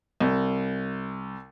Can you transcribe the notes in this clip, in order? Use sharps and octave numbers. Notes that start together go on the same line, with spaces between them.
C2